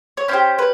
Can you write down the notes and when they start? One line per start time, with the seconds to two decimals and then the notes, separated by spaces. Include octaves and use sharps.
0.17 C#5
0.28 C#4 E4 G4 C5
0.59 B4